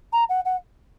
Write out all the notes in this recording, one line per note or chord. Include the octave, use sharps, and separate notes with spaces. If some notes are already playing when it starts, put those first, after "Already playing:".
A#5
F#5
F#5